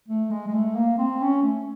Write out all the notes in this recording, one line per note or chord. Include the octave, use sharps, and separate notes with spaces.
A3
G#3
G#3
A3
A#3
C4
C#4
A3